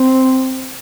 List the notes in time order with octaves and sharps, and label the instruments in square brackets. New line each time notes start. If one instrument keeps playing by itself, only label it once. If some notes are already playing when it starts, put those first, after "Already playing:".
Already playing: [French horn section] C4